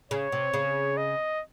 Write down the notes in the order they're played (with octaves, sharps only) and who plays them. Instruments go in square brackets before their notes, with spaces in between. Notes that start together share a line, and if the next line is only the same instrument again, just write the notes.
[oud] C#3 [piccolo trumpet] C#5
[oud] C3
C#3
[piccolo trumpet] D#5